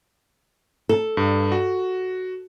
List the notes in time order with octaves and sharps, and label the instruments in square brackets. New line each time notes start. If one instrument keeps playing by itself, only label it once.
[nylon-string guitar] A4
[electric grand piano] G2
F#4